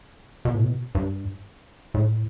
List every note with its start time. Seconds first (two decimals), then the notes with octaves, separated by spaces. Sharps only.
0.45 B2
0.54 A2
0.63 B2
0.95 G2
1.94 A2